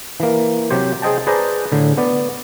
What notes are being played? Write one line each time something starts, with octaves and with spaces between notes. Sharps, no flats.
E3 A#3
C3 F#3 G4 C5
G#4 C5 D#5 G5 A5
G#4 B4 C5 D5 A5 A#5
A2 D3
B3 D5